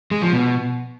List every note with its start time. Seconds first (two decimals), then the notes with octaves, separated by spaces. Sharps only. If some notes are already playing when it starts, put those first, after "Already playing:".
0.11 G#3
0.22 F3
0.32 B2